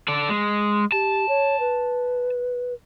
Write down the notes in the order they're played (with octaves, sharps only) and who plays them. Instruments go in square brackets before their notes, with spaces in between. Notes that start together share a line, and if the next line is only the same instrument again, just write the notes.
[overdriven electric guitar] A4 D5
G#3
[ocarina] G4 [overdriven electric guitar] A5
[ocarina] C#5
B4